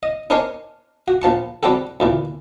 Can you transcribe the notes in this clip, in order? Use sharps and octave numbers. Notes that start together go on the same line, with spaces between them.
D#5
D4 D#4 A#4 C5 C#5 G#5
F#4
A#1 F3 A5 C#6
G3 C4 F#4 G4 A4
D2 A#2 E3